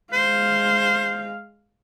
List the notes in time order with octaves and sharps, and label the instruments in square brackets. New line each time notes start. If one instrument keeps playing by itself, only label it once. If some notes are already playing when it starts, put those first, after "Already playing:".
[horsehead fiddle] G#3 F5 [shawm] C5